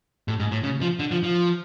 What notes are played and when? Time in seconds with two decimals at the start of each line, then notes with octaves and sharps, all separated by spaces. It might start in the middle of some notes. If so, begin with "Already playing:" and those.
0.28 A2
0.40 G#2
0.52 A2
0.63 C#3
0.81 F3
0.99 D3
1.11 F3
1.23 F3